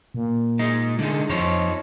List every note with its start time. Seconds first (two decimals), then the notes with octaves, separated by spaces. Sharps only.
0.14 A#2
0.59 G#3 D#4
0.99 D3 G#3 D#4
1.30 F2 D#4 C5 C#5